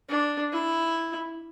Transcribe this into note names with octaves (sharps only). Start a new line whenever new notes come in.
D4
E4